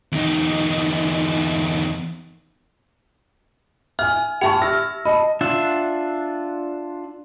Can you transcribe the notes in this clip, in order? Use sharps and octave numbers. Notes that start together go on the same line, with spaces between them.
E2 D#4
E5 G#5 F6
G4 E5 G5 A5 C#6
E5 E6 F6 A#6
D#5 A5 B5
D4 F4 E5 F#5